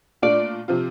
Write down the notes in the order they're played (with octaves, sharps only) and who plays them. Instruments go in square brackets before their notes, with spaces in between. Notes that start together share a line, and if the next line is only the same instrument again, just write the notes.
[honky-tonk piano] A#2 A3 D4 F4 [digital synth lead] D5
[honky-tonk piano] C3 F3 C4 F4